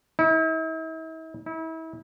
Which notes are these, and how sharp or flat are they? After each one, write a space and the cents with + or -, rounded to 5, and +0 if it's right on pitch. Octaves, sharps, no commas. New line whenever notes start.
E4 -45
E4 -35